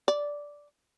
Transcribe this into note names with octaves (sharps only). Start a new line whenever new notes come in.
D5